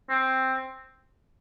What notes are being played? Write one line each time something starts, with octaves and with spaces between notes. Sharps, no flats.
C4